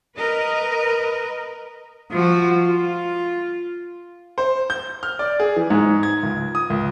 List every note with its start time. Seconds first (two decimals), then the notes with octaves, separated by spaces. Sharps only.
0.17 A#4 B4 D#5
2.12 F3 F#4
2.55 F4
4.38 C5
4.70 G6
5.03 F6
5.19 D5
5.40 G#4
5.56 E3
5.70 G#2
6.03 G#6
6.23 C#2
6.55 D#6
6.70 C#2